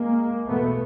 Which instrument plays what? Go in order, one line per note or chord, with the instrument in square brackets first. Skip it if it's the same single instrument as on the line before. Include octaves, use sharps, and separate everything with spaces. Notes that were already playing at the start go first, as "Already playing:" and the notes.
Already playing: [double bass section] G#3 A#3
E2 B2 A3 B3